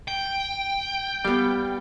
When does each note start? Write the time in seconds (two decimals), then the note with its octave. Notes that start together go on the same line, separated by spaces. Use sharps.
0.08 G5
1.25 G3 B3 F5